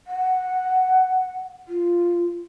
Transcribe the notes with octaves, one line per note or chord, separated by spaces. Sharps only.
F#5
F4